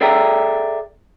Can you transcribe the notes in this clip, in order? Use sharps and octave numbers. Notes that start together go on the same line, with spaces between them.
G#4 A4 D5 E5 G5 A#5